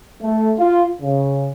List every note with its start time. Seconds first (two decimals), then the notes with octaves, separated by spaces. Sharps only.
0.21 A3
0.57 F4
1.00 C#3